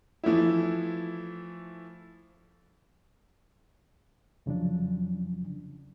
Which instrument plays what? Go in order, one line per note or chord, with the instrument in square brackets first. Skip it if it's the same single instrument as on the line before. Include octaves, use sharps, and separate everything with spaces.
[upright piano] E3 F3 A3 E4
[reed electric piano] F2 C#3 F3 F#3 D4